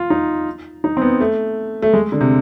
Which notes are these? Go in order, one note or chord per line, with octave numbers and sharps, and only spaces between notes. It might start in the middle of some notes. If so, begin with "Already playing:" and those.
Already playing: F4
D#4
D#4
C4
B3
A3
A3
G#3
D3
C3